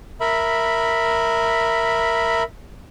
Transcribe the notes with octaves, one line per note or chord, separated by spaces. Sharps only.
A#4 E5 B5